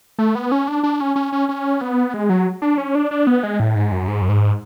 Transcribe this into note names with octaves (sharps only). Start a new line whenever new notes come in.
A3
B3
C#4
D4
D4
C#4
C#4
C#4
C#4
B3
G#3
F#3
D4
C#4
D4
D4
B3
G#3
A2
G#2
F#2
G#2
F#2
G#2